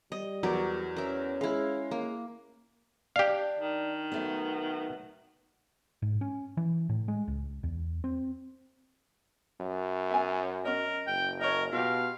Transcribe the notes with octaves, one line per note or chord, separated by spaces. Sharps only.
G3 D#5
E2 F#3 A#4 D5
C#4 A#4 E5
G#3 E4 F5
A#3
D4 G4 F5
D#3
F#3 A3 B3
G#2
C#4
E3
A2
G#3
C#2
E2
C4
F#2
E5 G#5
C#4 A#4 D#5
F#1 G5
A#4 C#5 D#5
B2 F4 G4 F5